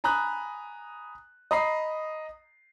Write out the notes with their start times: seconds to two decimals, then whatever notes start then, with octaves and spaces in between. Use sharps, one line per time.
0.04 G#5 A#5 B5 D#6 F#6
1.51 D#5 A#5 B5 D#6 C7